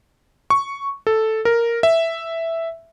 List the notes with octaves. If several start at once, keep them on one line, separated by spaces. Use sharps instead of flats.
C#6
A4
A#4
E5